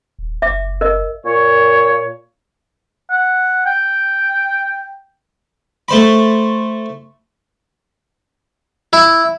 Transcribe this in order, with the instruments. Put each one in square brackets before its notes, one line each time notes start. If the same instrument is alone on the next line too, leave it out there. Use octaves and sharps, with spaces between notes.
[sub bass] D#1
[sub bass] F#1 [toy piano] E5 D6
[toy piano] A#4 D#5
[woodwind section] A#2 C#5
[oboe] F#5
G5
[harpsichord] A3 C5 B5
E4